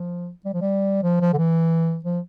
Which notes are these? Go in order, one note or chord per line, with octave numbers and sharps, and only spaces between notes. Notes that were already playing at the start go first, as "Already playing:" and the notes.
Already playing: F3
G3
F3
G3
F3
F3
D3
E3
F3